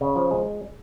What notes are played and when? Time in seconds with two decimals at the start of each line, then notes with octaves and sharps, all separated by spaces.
0.01 C#3
0.16 F3
0.31 G#3